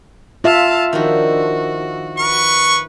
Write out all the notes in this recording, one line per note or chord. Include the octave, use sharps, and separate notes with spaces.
F4 E5 F5 A5
D#3 F3 D4 F#4
B4 C#6